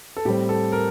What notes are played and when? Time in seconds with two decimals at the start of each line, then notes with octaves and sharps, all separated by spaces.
0.17 A4
0.25 A2 G3 C4 G4
0.49 A4
0.72 A#4